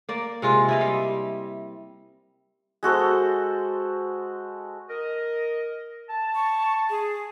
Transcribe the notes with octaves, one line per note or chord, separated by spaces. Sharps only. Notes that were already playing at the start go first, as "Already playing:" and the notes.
A#3 D5
C3 G#3 F4
E4 D#5 F5
G3
G#3 F#4 A4 C5
A#4 D#5
A5
C#6
G#4